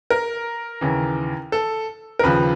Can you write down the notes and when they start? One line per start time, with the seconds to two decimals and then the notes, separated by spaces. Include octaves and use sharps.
0.10 A#4
0.81 D#2 C#3 E3
1.52 A4
2.19 A#4
2.23 D#2 C#3 F3 B4